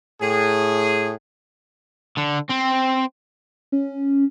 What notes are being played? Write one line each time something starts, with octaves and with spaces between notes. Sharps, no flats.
A2 G#4
D3
C4
C#4